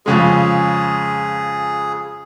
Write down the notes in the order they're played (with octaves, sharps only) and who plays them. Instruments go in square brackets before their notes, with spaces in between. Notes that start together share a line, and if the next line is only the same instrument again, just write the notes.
[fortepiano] F2 C#3 G#3 [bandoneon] G#4